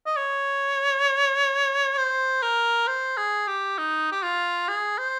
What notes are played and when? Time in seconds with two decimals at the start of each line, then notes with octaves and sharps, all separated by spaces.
0.06 D#5
0.17 C#5
1.98 C5
2.42 A#4
2.88 C5
3.17 G#4
3.47 G4
3.78 D#4
4.12 G4
4.23 F4
4.68 G#4
4.98 C5